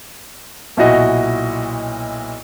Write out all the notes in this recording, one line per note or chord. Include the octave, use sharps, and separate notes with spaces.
B1 A#2 E4 F#4 D#5